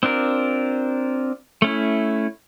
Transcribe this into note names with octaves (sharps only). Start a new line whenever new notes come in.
C4 D4 F4 A#4
A3 C#4 E4